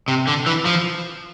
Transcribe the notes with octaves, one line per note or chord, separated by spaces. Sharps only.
C3
D3
E3
F3